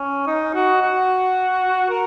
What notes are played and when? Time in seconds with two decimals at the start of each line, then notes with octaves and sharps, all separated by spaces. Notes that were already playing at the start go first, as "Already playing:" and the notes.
Already playing: C#4
0.27 D#4
0.55 F#4
0.81 F#4
1.90 A#4